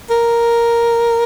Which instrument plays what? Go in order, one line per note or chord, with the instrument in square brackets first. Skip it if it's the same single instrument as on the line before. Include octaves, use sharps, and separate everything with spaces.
[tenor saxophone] A#4